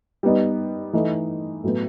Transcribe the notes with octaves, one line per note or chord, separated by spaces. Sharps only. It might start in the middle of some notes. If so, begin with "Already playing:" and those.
G3 B3 D#4
E3 A3 D#4
A2 F#3 B3